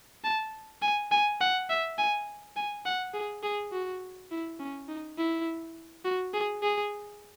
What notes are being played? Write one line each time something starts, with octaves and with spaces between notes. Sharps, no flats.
A5
G#5
G#5
F#5
E5
G#5
G#5
F#5
G#4
G#4
F#4
E4
C#4
D#4
E4
F#4
G#4
G#4